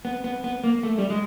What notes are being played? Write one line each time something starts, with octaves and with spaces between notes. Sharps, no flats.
B3
B3
B3
A#3
A3
G3
G#3